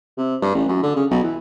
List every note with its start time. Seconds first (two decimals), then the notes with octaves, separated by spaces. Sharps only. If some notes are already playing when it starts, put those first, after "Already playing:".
0.17 C3
0.42 G2
0.55 A1
0.68 F#2
0.83 D3
0.96 C#3
1.11 B1
1.23 E3